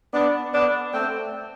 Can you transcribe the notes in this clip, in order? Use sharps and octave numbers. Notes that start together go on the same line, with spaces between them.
B3 D4
B3 D4
A3 C4